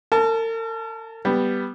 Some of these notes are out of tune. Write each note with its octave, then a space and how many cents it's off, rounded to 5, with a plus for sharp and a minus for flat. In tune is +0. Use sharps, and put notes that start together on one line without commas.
A#4 -45 A5 -15
G3 +0 B3 +0